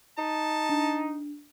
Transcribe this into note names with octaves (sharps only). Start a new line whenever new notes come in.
D#4 A5
D4